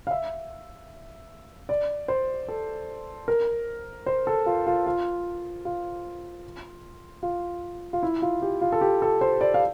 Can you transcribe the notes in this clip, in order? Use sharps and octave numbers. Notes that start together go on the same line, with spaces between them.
F5
E5
D5
C5
A4
A#4
C5
A4
F4
F4
F4
F4
F4
F4
E4
F4
G4
F4
A4
G4
A4
C5
D5
F5